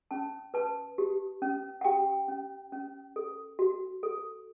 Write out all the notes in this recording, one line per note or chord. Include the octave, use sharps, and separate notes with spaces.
C#4 A5
B4 A5
G4
C#4
F#5
G4 G5
C#4
C#4
A4
F#4
A4